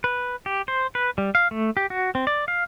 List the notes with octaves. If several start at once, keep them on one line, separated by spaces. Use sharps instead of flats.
B4
G4
C5
B4
G3
F5
A3
G4
F#4
C4
D5
F5